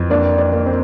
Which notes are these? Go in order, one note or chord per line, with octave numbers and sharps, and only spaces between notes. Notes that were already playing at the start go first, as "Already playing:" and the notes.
Already playing: F2 E3
A#3 D4 D5
D4 D5
A#3
C4 C5